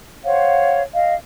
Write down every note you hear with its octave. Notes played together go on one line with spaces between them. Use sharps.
C5 C#5 F5 F#5
D#5 F5